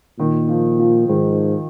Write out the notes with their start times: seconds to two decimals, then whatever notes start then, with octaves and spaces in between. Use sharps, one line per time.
0.19 A#2 D#3
0.49 F3
0.79 F3
1.09 G#2 D#3